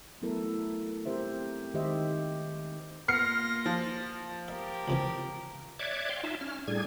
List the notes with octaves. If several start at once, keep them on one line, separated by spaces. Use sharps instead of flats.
F#3 A3 B3 E4 A4 A#4
C4 G4 A#4 C5 E5
D#3 G#3 G4 C5 D#5 E5
A#3 B3 F4 F6 A#6 C7 C#7
F3
G4 A#4 E5
C#2 C3 E3
C#5 D5 E5 D6 F#6 G#6
F5 G5 C6
D#4 F4 E5 A5
C#4 F6
A2 G3 D4 G#4 G#6